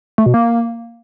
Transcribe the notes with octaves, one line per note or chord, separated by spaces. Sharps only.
A3
B2
A#3